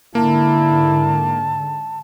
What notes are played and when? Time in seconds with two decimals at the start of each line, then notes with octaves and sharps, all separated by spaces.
0.15 G#2 D3 A#3 E4 A5